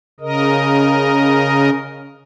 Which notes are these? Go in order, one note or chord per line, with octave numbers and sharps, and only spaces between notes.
C#3 A#4 D#5